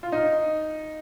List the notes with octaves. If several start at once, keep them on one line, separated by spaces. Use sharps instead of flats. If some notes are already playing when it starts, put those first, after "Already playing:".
F4
D#4